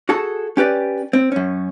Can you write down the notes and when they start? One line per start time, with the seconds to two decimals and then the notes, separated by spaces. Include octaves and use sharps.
0.09 F#4 G#4 A4 A5
0.57 C#4 G4 B4 D5
1.13 C4
1.32 F#2 C#4